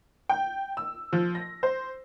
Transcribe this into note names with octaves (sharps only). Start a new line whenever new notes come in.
G5
E6
F3
A#6
C5